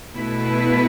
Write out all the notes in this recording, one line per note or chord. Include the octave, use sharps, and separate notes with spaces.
B2 A3 E4 B4